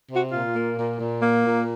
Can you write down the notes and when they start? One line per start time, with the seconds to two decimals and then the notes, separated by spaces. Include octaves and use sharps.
0.10 C3
0.16 F#4
0.32 A#2 F4
0.55 A#3
0.77 A#2
0.99 A#2
1.22 A#3
1.44 A#2